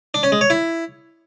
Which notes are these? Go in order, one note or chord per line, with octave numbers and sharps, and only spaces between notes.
D4
C#4
G#3
C#5
E4